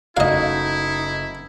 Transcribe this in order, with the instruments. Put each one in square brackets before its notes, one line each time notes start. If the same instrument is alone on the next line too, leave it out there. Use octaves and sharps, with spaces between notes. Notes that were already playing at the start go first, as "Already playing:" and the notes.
[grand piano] F#1 A3 F#4 [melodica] D#4 [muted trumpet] E4 [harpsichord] D#5 F5